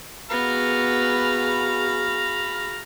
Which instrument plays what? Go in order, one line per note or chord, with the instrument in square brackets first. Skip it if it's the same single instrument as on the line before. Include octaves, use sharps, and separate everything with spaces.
[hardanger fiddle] B3 [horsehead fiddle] F#4 G#4 [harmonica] F5 A#5 B5